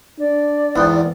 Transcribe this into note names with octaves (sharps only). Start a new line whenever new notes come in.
D4 D5
E2 G#2 B3 G5